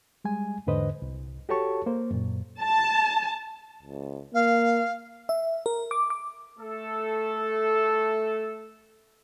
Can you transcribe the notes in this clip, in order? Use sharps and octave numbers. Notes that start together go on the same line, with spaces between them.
G3 G#3 G#5
E2 G#2 D3 B4 C5 D#5
C2
F#4 G4 A4 C#5 A5 C#6
A#3 C5
F#2 A#2
A5
C#2
A#3 F5
E5
A#4
D6
D6
A3 A4